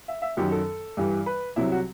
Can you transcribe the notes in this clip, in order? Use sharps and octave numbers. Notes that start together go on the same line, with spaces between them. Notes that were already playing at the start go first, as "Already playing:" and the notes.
E5
E5
F#2 D#3 F#3 G4
A4
G2 E3 G3
B4
C2 C3 F#3 E4
F#4